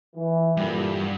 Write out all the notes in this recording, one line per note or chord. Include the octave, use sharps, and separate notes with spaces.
E3
G2 A#2 D3 G3